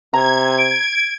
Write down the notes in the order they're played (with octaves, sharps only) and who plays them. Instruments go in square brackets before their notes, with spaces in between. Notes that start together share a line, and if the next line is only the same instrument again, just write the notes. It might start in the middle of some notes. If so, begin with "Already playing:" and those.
[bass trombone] C3 [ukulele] A#5 [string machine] G#6
[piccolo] D7